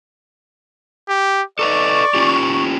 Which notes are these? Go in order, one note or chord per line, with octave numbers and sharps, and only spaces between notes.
G4
A4 B4 D5 D#5 C#6
C#4 F4 G4